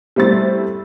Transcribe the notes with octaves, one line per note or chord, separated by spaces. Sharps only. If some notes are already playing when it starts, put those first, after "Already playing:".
G3 A3 C4 E4 A6